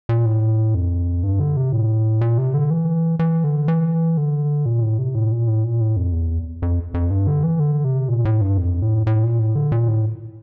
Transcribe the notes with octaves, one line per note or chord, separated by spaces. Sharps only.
A#2
A2
F2
G2
D3
C3
A2
A#2
C3
D3
E3
E3
D3
E3
D3
A#2
A2
C3
A2
A#2
A2
A#2
A2
F2
E2
F2
F2
G2
D3
E3
D3
C3
A#2
A2
G2
F2
A2
A2
A#2
A2
D3
A#2
A2